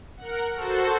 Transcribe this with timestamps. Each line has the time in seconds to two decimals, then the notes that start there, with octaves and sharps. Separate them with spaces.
0.17 A#4 F#5
0.54 F#4 A4 C5